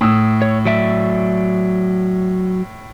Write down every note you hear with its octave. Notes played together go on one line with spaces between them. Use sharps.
A2 D#6 E6
C#5
F#3 D5 E5